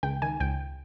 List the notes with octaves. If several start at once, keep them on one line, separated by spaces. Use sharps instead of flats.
C#2 G5
D#3 G#5
C#2 G5